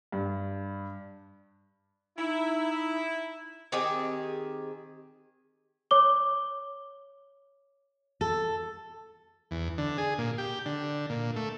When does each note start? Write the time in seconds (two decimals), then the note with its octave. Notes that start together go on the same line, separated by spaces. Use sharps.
0.12 G2
2.18 D#4 E4
3.72 D#3 C4 G4 G#4
5.91 C#5 D6 G7
8.21 A4
9.51 E2
9.78 D3
9.98 G#4
10.18 A#2
10.38 G4
10.66 D3
11.10 A#2
11.36 A3